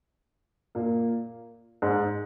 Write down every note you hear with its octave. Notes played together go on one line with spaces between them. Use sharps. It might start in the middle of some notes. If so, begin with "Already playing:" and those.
A#2 A#3
G#2 G#3